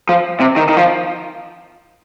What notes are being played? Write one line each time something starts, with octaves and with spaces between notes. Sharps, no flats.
F3
C3
D#3
D#3
F3